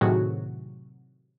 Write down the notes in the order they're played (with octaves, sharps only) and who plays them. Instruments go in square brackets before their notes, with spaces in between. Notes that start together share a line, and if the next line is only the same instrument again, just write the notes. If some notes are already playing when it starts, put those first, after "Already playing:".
[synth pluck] A2 C3 D#3 F#3 F#4 G#4